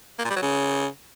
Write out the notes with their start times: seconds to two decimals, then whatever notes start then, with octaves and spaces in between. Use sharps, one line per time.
0.19 A#3
0.25 A#2
0.30 G3
0.36 F#3
0.42 C#3